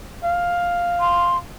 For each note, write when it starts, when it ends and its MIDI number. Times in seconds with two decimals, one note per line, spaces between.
0.24 1.41 77
1.00 1.37 84